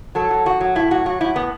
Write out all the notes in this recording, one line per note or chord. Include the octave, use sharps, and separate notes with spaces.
F#3 A4
F#3
F#2 F#4
F#3
A2 E4
F#3 F#4
F#3 F#4
A2 E4
A2 B3